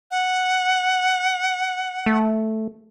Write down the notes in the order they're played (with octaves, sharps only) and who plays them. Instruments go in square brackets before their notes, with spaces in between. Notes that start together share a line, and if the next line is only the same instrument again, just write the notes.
[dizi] F#5
[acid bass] A3